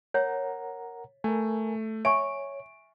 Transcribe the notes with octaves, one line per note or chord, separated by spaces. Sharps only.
A#4 C#5 F#5 A#5
A3 A#4 G#5
C#5 E5 G#5 C#6 D7